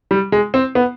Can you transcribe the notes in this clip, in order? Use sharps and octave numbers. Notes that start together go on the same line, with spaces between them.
G3
G#3
C4
B3